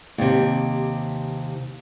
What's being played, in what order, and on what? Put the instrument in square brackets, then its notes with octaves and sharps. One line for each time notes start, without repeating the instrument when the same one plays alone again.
[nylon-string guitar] D#2 C3